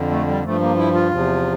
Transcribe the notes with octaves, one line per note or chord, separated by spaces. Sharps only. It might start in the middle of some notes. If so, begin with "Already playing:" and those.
Already playing: F2 D3
A3
G3
G2 F3 A3
A#3
E4
F4
E2 C3 F3